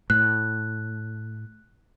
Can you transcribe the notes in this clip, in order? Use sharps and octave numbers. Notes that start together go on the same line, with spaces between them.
A2 F#6